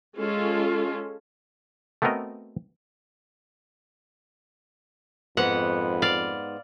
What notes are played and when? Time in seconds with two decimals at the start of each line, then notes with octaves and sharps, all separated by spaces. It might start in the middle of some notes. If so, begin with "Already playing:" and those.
0.17 G#3 C#4 F4 A4
2.02 A3 B3 C4 F#4 A#4 D#5
5.37 F2 G#2 B3 F#5
6.02 D5 F5